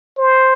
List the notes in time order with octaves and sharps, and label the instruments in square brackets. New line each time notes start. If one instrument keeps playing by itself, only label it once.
[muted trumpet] C5